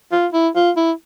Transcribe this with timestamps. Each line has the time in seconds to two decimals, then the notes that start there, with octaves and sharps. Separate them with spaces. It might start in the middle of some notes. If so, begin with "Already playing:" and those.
0.12 F4
0.33 E4
0.55 F4
0.76 E4